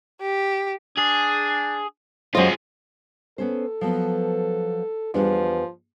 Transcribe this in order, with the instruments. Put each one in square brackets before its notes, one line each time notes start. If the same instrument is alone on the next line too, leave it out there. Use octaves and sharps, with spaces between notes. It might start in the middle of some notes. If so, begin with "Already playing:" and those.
[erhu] G4
[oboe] D4 [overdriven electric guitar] G#4
[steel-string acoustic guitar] F#2 C5 [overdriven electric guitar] F4 G#4 [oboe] D#5
[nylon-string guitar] B3 C#4 C5 [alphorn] A4
[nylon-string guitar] F3 F#3 B3
[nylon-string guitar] E2 G3 D4 [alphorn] F3